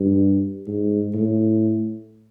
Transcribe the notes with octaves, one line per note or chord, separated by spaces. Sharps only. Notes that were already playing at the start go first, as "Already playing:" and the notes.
Already playing: G2
G#2
A2